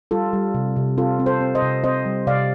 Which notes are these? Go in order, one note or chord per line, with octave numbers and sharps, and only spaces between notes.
G3 F4 A4
G3
C3
C3
C4 F4 A4
C4
A4 C5
C4
C5 D#5
C3
C4 C5 D#5
G3
C3 D5 F5